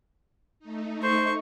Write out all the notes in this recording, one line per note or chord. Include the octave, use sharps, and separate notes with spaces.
A3 D#4
C5 C#6